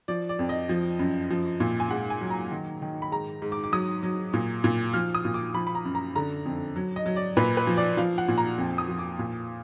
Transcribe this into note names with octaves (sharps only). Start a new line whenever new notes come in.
F3 D5
D5
F2
D#5
F3
F#2
F3
A#2
G#5
G#2 F#5
G#5
F#3
A#5
D#3
D#3
B5
G#2 A#5
G#2
D6
D6
F#3 D#6
F#3
A#2
A#2
F3 F6
D#6
A#2
D6
F3 B5
B5
A#5
F#2
A#5
D3 A#5
F2
F#3
D#5
F#3
D5
A#2 B4
B4
F3
D5
F3 F5
F#5
A#2
A#5
F2
D#6
F3
D6
A#2